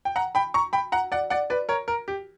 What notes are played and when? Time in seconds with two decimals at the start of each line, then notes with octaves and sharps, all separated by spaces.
0.05 G5
0.16 F#5 A#5
0.35 G5 B5
0.54 A#5 C#6
0.73 G5 B5
0.92 F#5 A#5
1.12 D5 F#5
1.30 D5 F#5
1.50 B4 D5
1.69 A#4 C#5
1.88 A#4
2.08 G4